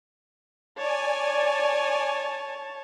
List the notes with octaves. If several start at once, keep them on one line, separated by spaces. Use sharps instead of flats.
C#5 D5 G#5 A5